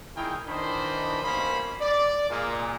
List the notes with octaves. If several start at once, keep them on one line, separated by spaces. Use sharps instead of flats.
A#2 D#3 E4 G#4 A#4 G5
D#3 E3 D4 C5 D#5 B5
G2 B2 A#3 C#4 C5 B5
D5
A#2 G#3 A#3